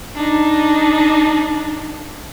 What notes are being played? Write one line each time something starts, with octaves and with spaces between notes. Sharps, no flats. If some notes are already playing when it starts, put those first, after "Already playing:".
D4 D#4